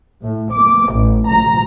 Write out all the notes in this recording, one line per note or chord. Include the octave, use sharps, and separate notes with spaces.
A2
D6
A1
A#5